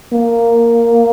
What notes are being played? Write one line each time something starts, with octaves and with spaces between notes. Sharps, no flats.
A#3